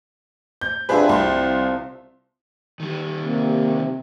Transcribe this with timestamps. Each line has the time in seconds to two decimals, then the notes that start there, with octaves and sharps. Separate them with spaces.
0.61 G6
0.89 C3 F3 C4 D4 G#4 B4
1.09 C2 C6
2.80 D#3 G3
3.24 C3 A#3